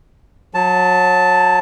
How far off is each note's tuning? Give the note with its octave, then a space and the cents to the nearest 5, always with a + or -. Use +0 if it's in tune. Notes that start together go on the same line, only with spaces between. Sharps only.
F#3 -25 A5 +0